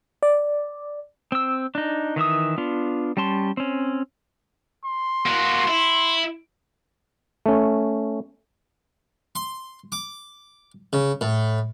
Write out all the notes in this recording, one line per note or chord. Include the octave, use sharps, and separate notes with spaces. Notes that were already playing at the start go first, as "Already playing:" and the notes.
D5
C4 E6
D4 D#4
D#3 E3 E5 D#6
B3 D4 F4
G3 C#4 A5 C6
C4 C#4
C6
A#3 F#4
E4
A3 C#4
C6
D6
C#3
A2